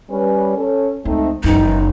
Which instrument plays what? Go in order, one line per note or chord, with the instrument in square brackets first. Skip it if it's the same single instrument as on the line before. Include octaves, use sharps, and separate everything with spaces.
[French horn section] G3 C#4 B4
C#4 A4
[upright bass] C#2 [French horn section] A3 C4 D#4
[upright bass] F#1 F#2 [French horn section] D#3 E3 [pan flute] D#4